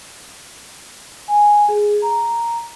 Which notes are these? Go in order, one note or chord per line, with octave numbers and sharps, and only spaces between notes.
G#5
G#4
A#5